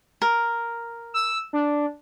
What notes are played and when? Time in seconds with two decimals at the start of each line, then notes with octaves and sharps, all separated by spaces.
0.22 A#4
1.14 E6
1.53 D4